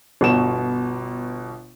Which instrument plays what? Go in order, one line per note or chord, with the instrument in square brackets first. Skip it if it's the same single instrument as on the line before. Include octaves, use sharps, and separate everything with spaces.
[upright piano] G1 B2 E7